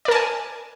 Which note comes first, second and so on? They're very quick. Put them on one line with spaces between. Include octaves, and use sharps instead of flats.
D5 A#4 A5 G#5